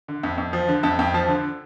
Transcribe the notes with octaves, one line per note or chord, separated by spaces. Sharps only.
D3
F2
F2
F3
D3
F2 A5
F2 G5
F3 A5
D3